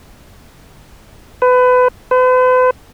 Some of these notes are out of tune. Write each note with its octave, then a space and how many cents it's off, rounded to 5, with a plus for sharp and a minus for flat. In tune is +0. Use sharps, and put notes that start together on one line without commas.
B4 +25
B4 +45